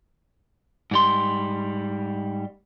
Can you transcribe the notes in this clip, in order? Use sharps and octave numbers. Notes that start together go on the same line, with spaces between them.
G#2 G3 C6